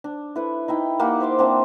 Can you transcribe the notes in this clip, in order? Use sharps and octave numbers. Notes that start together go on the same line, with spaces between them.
D4
E4 A4 B4
D#4 E4 G5
A#3 G4 F#5
C5 E5 C6 D6
A#3 C4 D4